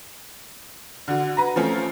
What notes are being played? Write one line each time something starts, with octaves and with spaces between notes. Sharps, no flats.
D3 F#4
B4 A#5
F3 A3 C4 C#4